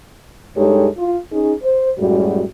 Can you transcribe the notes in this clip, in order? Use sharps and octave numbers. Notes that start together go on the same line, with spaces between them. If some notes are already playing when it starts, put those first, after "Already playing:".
G2 G#3 D#4 G4 A4 C#5
F4
C#4 D#4 G#4
C5
F#2 A2 G3 G#3 F#4